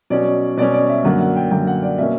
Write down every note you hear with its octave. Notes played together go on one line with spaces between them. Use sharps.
B2 F#3 C#4 D5
B2 F#3 C#4 D5
D5
E5
F#2 D3 A#3 F#5
F#5
G5
F#2 D3 A#3 G5
F#5
D5
B2 A#3 C#4 E5